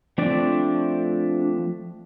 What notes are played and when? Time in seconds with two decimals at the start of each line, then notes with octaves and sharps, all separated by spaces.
0.18 F3 A3 C4 D4 D5